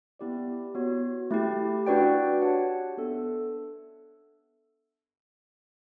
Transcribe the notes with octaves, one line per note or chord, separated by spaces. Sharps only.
B3 E4 G4 D5
B3 F#4 C#5
A3 E4 G4
D4 F#4 B4 D5 G5
G4 C#5 F#5 A5
B3 D4 A4 E5